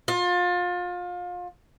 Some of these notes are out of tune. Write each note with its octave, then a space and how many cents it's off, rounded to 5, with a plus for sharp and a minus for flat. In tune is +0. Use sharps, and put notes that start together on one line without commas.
F4 +30